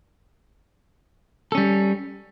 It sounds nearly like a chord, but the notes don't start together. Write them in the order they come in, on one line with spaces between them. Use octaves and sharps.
A4 C#4 G3